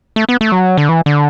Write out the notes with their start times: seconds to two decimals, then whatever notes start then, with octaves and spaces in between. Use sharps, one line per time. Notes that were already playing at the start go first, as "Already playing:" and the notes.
0.16 A3
0.29 B3
0.41 A3
0.52 F#3
0.77 D3
0.89 E3
1.06 D3